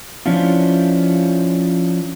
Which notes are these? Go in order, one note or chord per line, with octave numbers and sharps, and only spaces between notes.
F3 C#4 D4 E4 F4